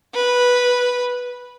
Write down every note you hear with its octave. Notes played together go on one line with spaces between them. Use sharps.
B4